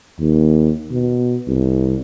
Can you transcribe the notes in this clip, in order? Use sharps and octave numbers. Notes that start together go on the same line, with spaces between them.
D#2
B2
C2